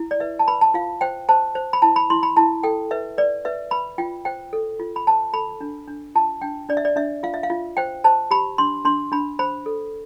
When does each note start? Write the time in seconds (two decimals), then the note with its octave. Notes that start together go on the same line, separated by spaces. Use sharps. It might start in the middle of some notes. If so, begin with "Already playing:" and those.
Already playing: E4
0.11 D5
0.20 B4 E5
0.39 A5
0.48 B4 B5
0.61 A5
0.74 F4 F5
1.01 C5 G5
1.29 C5 A5
1.55 C5
1.73 B5
1.82 E4 A5
1.96 B5
2.10 E4 C6
2.23 B5
2.36 E4 A5
2.63 A4 G5
2.91 B4 E5
3.18 B4 D5
3.45 B4 E5
3.71 B4 B5
3.98 F4 G5
4.25 C5 G5
4.53 A4
4.80 F4
4.96 B5
5.07 C5 A5
5.33 A4 B5
5.61 D4
5.88 D4
6.15 F4 A5
6.41 D4 G5
6.69 D4 D5
6.77 E5
6.85 D5
6.96 D4 E5
7.23 F4 F5
7.34 E5
7.43 F5
7.50 F4
7.77 C5 G5
8.04 C5 A5
8.31 G4 B5
8.58 D4 C6
8.85 D4 C6
9.12 D4 B5
9.39 C5 B5
9.66 A4